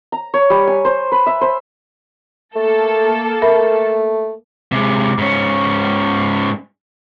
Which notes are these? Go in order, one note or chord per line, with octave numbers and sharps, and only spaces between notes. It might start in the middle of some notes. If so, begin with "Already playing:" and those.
A#5
C#5
G3
G#5
C5
B4
E5
C5
A3 A#3 A4
A3 A#4 E5 B5
C3 G#3
G#2 C#4